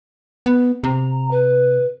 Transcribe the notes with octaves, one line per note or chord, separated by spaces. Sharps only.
B3
C3 A#5
B4